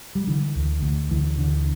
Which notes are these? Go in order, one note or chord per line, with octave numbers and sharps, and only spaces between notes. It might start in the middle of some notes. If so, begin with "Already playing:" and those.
G3
D3 E3
D2
D2
D2 E3
D3